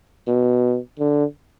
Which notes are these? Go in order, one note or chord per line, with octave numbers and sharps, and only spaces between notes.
B2
D3